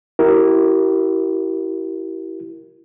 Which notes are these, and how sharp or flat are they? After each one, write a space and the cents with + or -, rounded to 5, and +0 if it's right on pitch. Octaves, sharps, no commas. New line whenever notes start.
E4 +0 G4 -40 A#4 +0